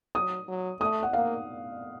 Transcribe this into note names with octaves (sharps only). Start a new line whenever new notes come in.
F#3 D#6
F#3
A3 D#6
F#5
A#3 F5